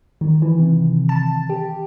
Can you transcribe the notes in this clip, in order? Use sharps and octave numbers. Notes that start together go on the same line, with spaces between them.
D#3
E3
C3
A5
G4